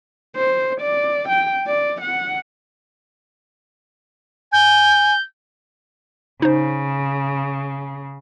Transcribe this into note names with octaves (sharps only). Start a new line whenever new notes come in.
C5
D5
G5
D5
F#5
G#5 G6
C#3 D#4 C5